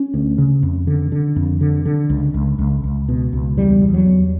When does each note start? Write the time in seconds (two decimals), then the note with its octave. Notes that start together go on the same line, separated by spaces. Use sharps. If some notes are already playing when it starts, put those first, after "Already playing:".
Already playing: C#4
0.14 D2
0.38 C#3
0.63 F2
0.87 D3
1.12 D3
1.36 F2
1.61 D3
1.85 D3
2.10 C#2
2.34 C#2
2.59 C#2
2.84 C#2
3.09 B2
3.33 C#2
3.57 E2 G3
3.81 E2
3.94 F#3
4.06 E2